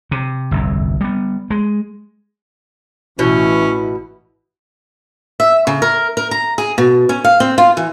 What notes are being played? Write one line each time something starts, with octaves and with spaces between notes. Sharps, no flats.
C3
G1 C2 F2
G3 B3
G#3
A1 B2 E3 C#4 E4
E5
C#3
A#4
A#4
A#5
G#4
B2
C#4
F5
C4
F4
E3